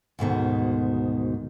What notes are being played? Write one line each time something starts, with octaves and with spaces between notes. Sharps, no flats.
D2 G#2 B2 D#3